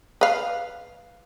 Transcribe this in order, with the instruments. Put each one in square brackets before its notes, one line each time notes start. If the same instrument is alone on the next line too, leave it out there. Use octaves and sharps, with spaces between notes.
[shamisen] B4 F5